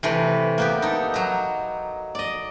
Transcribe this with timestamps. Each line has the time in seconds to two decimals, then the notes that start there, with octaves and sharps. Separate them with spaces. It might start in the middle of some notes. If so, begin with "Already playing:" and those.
0.03 C3 E3 A3
0.58 A#3 B3 G4
0.82 D#4 A4
1.14 F#3 A#5
2.15 D5 D#5